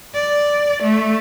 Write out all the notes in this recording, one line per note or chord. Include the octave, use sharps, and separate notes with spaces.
D5
A3